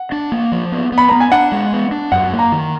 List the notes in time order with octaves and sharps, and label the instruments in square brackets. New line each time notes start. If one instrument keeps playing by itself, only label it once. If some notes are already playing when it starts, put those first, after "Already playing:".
Already playing: [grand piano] F#5
[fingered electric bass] D4
A#3
F3
B3
B3
[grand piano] B5
[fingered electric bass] B3 [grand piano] A#5
[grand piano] G#5
[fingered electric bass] D4 [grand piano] F#5
[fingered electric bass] G#3
B3
D4
[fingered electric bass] F#2 [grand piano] F#5
[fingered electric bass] A#3
[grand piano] A#5
[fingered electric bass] D#3